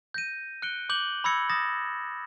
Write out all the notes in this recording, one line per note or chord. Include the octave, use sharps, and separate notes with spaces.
G6 A#6 D#7
F#6 C#7 D7 G7
D6 G6 F#7 G7
B5 D6 E6 G#6 A#6 C#7
D#6 A6 A#6 E7